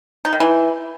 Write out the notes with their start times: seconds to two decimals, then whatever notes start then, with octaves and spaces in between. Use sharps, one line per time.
0.25 D#4
0.33 D#3
0.40 E3